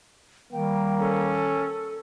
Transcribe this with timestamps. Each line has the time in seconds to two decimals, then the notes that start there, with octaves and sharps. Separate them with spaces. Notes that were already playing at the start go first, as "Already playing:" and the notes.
0.53 D#3 G3 A#3 G5
1.00 C#4 A4